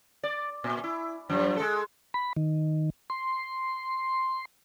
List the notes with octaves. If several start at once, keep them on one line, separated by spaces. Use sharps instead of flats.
D5
A#2
E4
F#2 F3
G#3 A4
B5
D#3
C6